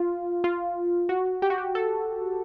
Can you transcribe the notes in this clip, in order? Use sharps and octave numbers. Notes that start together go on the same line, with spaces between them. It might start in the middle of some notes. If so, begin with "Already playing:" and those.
Already playing: F4
F4
F#4
G4
F#4
G4
A4